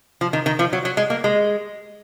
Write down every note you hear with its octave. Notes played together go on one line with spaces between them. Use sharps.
F3
D#3
D#3
F3
F#3
F#3
G#3
A#3
G#3